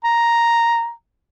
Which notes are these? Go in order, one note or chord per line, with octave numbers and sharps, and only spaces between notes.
A#5